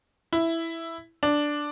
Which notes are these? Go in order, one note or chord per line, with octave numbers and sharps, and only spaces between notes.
E4
D4